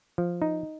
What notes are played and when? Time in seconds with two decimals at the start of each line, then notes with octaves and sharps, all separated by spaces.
0.18 F3
0.42 D#4